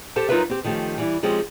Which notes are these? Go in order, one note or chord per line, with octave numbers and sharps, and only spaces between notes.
G4 A4 C5 A5
F#3 D#4 F4 A#4 B4 E5
C4 G4
D#3 F3 A3 C#4 G4
E3 G3 E4
F3 G#3 C4 C#4 G4